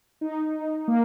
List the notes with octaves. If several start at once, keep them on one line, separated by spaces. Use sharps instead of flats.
D#4
A#3